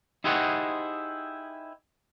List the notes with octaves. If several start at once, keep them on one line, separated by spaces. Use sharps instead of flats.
D#4 E4 G4 G#4 C5 F#5